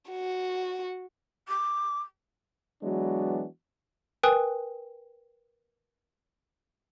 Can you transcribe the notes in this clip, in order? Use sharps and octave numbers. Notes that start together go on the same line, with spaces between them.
F#4
D6
E3 F#3 G#3 B3 D4 F#4
A#4 B4 G5 G#5 D#6 F#6